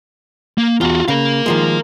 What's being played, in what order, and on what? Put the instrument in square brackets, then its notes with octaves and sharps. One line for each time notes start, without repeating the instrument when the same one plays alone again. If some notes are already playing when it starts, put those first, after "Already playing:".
[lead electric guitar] A#3
[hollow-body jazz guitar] E2 [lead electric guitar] F4 F#4
[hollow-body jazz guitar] C#3 [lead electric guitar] A#4 F5
[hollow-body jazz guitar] D#3 F3 G#3